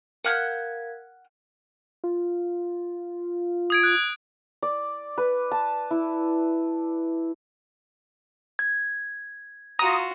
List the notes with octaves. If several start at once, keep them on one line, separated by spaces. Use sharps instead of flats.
A#4 F5 F#5 F6 G6 G#6
F4
D#6 G#6 D7
F#6
D5
B4
A5
E4
G#6
F4 F#4 A#5 D#6